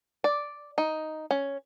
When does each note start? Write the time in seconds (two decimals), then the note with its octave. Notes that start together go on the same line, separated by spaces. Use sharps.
0.24 D5
0.78 D#4
1.31 C#4